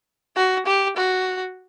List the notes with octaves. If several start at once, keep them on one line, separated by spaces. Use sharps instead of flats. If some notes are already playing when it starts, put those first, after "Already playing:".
F#4
G4
F#4